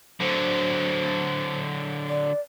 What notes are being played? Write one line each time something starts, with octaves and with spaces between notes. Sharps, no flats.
D3 F#3 C5
D5